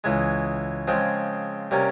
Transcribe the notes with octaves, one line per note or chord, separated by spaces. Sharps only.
C#2 C#3 E3 G#3
C#3 F3 G#3 C4
C3 G3 A#3 C#4